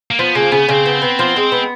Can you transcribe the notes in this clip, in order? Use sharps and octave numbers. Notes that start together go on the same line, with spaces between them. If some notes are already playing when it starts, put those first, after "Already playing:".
A#3
F3 B3
C#3 A#3
C#3 B3
C#3 C4
B3
B3
F3
G#3
B3